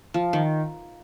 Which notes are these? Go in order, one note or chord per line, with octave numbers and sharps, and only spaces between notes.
F3
D#3